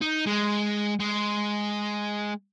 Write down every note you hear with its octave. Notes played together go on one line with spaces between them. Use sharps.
D#4
G#3
G#3